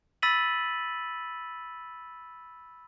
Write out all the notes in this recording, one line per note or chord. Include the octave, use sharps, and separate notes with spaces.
B5 E6 A6 B6 D#7 F#7